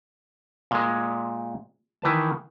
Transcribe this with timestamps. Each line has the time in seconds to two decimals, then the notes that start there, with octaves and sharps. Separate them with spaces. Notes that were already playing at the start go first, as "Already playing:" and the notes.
0.71 A#2 G#3
2.02 D#3 E3 B4 A5